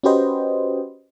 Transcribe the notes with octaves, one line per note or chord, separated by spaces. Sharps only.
C#4 F#4 G4 B4 C5 D#5